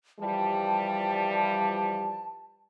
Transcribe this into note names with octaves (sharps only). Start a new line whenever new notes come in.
E3 F3 G3 A5